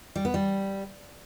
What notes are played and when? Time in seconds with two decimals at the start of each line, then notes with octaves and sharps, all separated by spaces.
0.16 G3
0.25 B3
0.34 G3